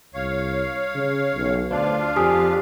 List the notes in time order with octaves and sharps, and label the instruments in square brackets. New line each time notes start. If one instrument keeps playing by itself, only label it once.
[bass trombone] C2 [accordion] C#5 F5
[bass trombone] C#3
B1
[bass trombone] D2 [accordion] D4 F4 F5 [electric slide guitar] C5 D5
[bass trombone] F2 [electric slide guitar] G4 [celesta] G#5 D#6